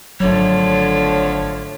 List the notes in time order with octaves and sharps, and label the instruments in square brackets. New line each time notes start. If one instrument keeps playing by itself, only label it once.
[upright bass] D#1 G#1 [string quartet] D3 F3 A3 [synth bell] F#3 [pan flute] C#5